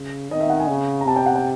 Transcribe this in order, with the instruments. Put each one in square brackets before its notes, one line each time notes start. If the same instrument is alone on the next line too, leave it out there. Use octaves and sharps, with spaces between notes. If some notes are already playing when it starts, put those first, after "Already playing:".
Already playing: [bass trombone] C#3
[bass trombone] D#3 [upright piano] D#5
[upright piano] E5
F#5
G#5
[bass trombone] C#3
[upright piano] A#5
[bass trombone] C3 [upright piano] A5
[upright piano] G5
F#5
G5